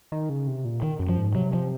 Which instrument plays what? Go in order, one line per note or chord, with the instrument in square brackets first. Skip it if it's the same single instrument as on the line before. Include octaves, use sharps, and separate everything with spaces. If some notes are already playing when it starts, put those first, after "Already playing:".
[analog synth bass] D#3
C#3
C3
A#2
[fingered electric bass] D#3
[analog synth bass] F#2
[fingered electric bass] F3
[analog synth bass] G#2
[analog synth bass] C3 [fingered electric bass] F#3
[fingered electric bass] F3